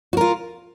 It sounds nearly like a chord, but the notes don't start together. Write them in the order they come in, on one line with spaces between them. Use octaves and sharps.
F#4 A#4 F4